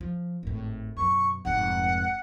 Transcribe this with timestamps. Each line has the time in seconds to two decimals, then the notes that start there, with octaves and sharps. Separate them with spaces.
0.01 F3
0.43 G#1 A2
0.97 F#2 B2 C#6
1.45 F1 G#2 F#5